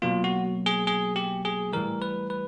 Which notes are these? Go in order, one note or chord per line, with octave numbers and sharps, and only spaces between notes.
B2 F#3 A#3 F4
F#4
G#4
G#4
G4
G#4
A2 E3 G3 A#4
B4
B4